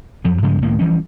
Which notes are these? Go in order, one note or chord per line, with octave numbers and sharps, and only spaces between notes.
F2 F3 F#3
G2 C#3 F3 G#3
C#2 A2 D#3 A#3
E3 F3 G3 C#4